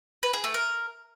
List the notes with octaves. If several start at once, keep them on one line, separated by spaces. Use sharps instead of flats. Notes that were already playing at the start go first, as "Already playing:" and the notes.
B4
G#4
A3
A#4